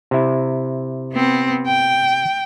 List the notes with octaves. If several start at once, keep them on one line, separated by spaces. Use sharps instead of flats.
C3 E4
B3 C4
G5